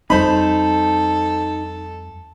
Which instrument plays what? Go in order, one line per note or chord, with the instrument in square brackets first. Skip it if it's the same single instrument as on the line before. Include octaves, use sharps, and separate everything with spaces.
[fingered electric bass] F2 G3 C4 [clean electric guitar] D#4 [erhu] A4 [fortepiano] C5 B5